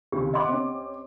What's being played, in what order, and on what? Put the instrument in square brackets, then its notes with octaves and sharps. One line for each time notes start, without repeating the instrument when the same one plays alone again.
[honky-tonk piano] C#2 C3 D#3 [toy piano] G4
[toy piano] D#5 C6 [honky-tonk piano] E5 F#5 D6
[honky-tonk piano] C4 C#4